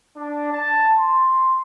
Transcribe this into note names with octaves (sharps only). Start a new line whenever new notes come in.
D4
A5
C6